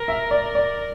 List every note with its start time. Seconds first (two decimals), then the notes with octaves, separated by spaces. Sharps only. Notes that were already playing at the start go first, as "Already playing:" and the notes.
Already playing: A#4
0.08 E5
0.31 D5
0.55 D5